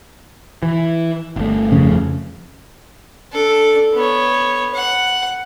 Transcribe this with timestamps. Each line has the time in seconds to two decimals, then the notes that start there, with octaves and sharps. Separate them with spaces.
0.63 E3
1.36 G1 A3
1.72 F2 C#3
3.33 D4 A4
3.94 B3 C#5
4.74 F#5